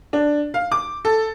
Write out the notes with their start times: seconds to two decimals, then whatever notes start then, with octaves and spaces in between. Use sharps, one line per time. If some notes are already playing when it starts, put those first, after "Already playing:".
0.13 D4
0.54 F5
0.72 D6
1.05 A4